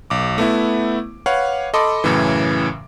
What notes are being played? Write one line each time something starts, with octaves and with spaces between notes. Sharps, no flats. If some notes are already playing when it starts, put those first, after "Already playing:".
B1 D6
A3 B3 E4
B4 C#5 F5 F#5
A4 D#5 B5 C6 D6
F#2 A2 C#3 E3